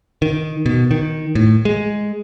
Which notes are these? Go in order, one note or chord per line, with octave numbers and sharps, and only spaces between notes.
D#3
B2
D#3
A2
G#3